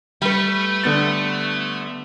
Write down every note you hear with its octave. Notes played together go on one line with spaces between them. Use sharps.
G3 A3 B4
D3 B3 A6